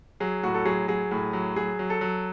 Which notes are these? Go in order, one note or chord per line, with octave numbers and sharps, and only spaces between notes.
F#3 G#4
A2 F#4
A4
F#3 G#4
F#3 G#4
A2
F#3
F#3 G#4
F#3
A4
F#3